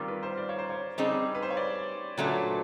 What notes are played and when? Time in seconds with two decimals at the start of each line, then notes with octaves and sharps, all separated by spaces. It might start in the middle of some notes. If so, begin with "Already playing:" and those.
Already playing: D#3 G3 C4 F4 A#4
0.08 B4
0.23 C5
0.37 D5
0.49 C#5
0.58 C5
0.70 C#5
0.98 G3 C4 D#4 G#4
1.35 B4
1.42 C5
1.50 C#5
1.57 D5
2.18 A#2 F#3 A3 D4